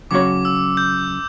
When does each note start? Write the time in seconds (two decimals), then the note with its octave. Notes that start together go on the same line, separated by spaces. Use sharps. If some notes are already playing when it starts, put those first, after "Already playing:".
0.11 C#3 F#3 C#4 F#4 C#5 D6
0.45 E6
0.77 G6